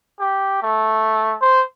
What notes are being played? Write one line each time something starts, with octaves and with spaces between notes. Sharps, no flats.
G4
A3
C5